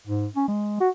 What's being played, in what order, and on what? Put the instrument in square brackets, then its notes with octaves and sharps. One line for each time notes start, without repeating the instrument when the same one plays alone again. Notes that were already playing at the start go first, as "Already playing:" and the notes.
[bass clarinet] G#2
C#4
G#3
F#4